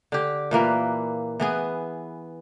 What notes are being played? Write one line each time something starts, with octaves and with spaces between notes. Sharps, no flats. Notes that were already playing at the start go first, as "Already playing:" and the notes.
D3 G4
A#2 E3 A#3 B4
E3 B3 G#4